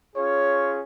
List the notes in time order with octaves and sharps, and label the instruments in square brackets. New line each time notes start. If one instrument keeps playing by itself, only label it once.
[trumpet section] C#4 F4 G#4 C#5